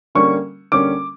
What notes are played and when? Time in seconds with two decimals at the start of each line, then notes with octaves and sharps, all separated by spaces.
0.15 D3 G3 A#3 C#4 C#6
0.72 D3 G3 A#3 C#4 D6